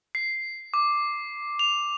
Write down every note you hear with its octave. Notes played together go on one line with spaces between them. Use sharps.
C7
D6
F7